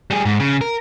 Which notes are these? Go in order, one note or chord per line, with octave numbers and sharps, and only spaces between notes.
G3 G#4
G#2
C#3
A#4